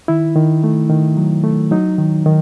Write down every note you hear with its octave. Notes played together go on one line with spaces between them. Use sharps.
D#3 E4
D#3
A3
D#3
F#3
A3
F#3 D#4
D#3
D#3